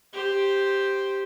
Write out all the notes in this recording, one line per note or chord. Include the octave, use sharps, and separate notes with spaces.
G4 C5